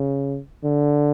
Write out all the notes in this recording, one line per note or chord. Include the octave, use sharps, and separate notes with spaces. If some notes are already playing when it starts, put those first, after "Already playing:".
Already playing: C#3
D3